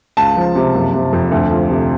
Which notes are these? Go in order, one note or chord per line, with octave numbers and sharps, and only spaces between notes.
C#2 A5
F3
C3
F#1
C3
F2
D2
F3
C3